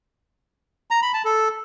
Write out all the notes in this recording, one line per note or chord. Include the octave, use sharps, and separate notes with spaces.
A#5
B5
A5
A4